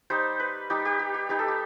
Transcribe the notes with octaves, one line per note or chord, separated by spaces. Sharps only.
G3 D#4 C5
B4
G3 D#4 G4
G4
G4
G4
G3 D#4 G4
A4
G4